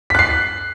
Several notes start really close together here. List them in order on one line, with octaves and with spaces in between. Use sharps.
B6 F#6 C7